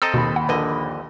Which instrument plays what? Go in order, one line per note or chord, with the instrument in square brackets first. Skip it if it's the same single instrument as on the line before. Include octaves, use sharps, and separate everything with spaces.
[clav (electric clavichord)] C4 A4 D#5 [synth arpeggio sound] A#5 D#6 E6
[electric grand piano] D#2 B5 [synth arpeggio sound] B2
[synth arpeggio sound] F#5
[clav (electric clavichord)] A#1 D3 D#5 [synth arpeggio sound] B4